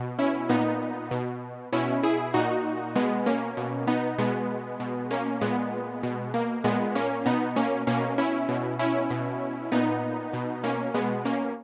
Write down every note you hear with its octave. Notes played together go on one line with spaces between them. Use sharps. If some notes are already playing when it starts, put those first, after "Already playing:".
Already playing: B2
C#4 E4
A#2 B3 D#4
B2
B2 C#4 E4
E4 G#4
A#2 D#4 F#4
B2 G#3 B3
A#3 C#4
B2
B3 D#4
B2 G#3 B3
B2
A#3 C#4
A#2 G#3 B3
B2
A#3
A#2 G#3 B3
A#3 C#4
B2 B3 D#4
A#3 C#4
B2 A#3 C#4
C#4 E4
B2
C#4 E4
B2
A#2 B3 D#4
B2
A#3 C#4
B2 G#3 B3
A#3 C#4